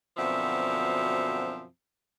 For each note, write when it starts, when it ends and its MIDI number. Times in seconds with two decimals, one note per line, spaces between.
0.17 1.65 42
0.17 1.65 47
0.17 1.65 50
0.17 1.65 53
0.17 1.65 60
0.17 1.65 76